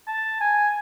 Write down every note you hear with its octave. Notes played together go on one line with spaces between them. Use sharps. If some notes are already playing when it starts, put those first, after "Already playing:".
A5
G#5